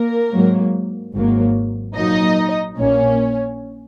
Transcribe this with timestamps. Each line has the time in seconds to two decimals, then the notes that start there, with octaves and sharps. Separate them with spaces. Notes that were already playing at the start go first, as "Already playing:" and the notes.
Already playing: A#3 A#4
0.31 G#2 F#3 A#3
1.13 G#1 G#2 F#3 A#3
1.95 A#1 A#2 F#3 A#3 D#4 D#5
2.78 A#1 A#2 A#3 C#4 C#5